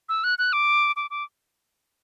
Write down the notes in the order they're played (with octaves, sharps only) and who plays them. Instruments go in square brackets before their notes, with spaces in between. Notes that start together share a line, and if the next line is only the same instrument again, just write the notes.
[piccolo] E6
F#6
F#6
D6
D6
D6